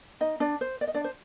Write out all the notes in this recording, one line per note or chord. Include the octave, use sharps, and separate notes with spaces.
D#4 D#5
D4 D5
C5
D5
D#5
D4 D5
C5